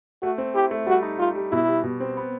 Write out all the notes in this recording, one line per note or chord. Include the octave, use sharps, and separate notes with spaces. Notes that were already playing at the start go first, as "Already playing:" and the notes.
A3 F#4
C4
E4 G4
A3
G3 F#4
D#4
G3 F4
G3
B2 E4
G3
B2
C4
B3